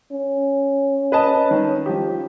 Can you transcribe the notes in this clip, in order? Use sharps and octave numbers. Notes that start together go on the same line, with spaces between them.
C#4
B4 D#5 A5
D#3
F3 G4